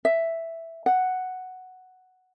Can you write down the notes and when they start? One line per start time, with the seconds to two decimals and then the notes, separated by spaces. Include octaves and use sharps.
0.05 E5
0.86 F#5